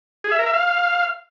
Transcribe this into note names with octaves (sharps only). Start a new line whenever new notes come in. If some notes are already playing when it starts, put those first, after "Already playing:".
G#4
E5
A#4
E5
F5